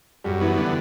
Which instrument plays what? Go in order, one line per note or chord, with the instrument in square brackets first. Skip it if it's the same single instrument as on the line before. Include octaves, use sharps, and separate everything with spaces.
[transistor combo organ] F#2 [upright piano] G3 G4
[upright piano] E3 E4 [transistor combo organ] B3
[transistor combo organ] D3 [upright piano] E3 E4